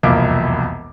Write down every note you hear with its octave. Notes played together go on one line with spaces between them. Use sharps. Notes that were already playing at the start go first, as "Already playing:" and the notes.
E1 C2 F2 A#3 E5 D6